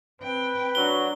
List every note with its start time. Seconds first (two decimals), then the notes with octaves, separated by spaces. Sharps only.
0.21 C4 B4 G5
0.75 F#3 D4 F#4 G7